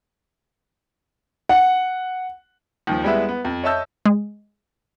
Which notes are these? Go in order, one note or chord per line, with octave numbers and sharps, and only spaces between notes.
F#5
D#2 D#3 F3
G3 G#3 B3 E4 E5
B3
F2
C#5 D#5 E5 A5 E6 G6
G#3